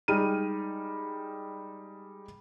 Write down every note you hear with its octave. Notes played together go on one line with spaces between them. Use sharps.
G3 G#3 D#4 F6 D#7